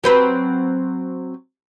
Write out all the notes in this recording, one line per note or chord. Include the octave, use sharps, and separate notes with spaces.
F#3 C4 B4